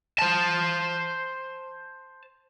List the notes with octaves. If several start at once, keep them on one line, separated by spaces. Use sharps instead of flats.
C5 A5